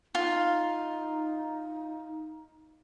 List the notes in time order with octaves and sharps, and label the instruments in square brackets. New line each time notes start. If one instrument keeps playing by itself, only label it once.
[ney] D#4 [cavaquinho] F4